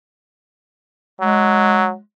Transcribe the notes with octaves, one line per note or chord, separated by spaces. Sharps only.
F#3 G#3